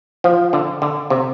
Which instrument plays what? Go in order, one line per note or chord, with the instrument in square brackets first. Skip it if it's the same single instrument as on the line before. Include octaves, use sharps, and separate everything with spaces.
[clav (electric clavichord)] F3
D3
D3
C3